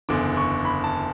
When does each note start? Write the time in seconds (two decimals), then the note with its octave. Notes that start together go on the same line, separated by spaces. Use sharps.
0.09 F#1 E2 D3 D6
0.37 C#6
0.65 B5
0.84 A5